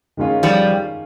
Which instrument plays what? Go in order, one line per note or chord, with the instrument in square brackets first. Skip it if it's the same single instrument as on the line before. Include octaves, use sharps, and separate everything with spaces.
[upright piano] D#3 G#3 C#4 F4
[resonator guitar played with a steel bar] F3 G3